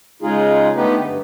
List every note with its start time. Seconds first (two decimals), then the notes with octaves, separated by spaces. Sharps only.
0.22 C#3 G#3 D#4 F4 G#4
0.76 D3 A3 B3 D#4 G4 B4
1.05 G2